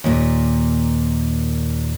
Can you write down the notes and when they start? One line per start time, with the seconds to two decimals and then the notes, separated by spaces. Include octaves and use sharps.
0.04 D#2 A#2